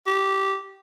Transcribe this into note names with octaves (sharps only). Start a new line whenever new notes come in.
G4